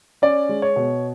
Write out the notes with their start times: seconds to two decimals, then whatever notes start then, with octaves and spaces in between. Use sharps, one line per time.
0.22 C#4 D5
0.49 G#3
0.62 C#5
0.76 B2